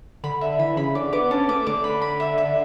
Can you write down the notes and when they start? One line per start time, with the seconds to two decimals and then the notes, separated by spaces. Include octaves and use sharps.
0.23 D3 B5
0.41 D3 E5
0.59 E3 B5
0.77 C#3 B5
0.95 D3 D6
1.13 B3 D6
1.31 C#4 A4
1.49 A3 D6
1.67 D3 D6
1.84 B5
2.02 B5
2.20 E5
2.38 E5